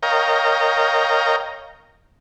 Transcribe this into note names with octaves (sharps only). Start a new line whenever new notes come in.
A#4 C#5 D#5 F5 G5 A#5